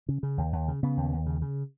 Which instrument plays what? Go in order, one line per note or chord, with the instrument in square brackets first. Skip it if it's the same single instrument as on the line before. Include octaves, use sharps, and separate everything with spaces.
[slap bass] C#3
C#3
D#2
D#2
C#3
C#3 B3
D#2
D#2
C#3
C#3